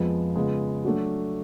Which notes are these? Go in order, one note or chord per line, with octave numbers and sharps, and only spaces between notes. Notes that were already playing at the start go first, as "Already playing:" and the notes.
Already playing: F2 F3 G#3 B3
C#3 G#3 B3 F4
F#3 A3 D4 F#4